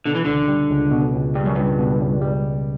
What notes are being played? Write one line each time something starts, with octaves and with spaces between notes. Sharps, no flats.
B2 D3
E3
C#2 D3
G3
C#2
B2
C#2
G2 G3
F#2
C#2 G2
B2
C#2
G3